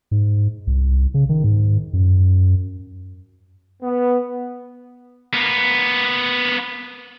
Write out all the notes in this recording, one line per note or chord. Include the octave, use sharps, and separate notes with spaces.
G#2
C2
C#3
D#3
G#2
F#2
B3
A#3 B3